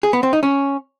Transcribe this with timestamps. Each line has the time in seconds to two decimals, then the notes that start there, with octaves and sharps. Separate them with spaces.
0.03 G#4
0.13 B3
0.23 C4
0.33 D#4
0.43 C#4